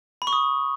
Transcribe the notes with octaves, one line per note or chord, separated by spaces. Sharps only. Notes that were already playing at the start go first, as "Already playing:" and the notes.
B5
C#6
D#6